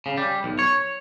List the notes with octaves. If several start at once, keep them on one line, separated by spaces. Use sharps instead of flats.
C#3
G3
B1
C#5